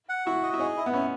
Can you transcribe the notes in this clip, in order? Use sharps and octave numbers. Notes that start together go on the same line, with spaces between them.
F#5
E4 F#4
D#5
E4
D#4 G#4
E4
B3
C#4 E4